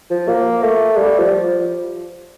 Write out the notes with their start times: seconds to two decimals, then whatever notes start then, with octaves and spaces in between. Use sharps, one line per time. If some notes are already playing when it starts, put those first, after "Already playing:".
0.11 F3
0.28 A#3
0.62 A3
0.96 G3
1.19 F3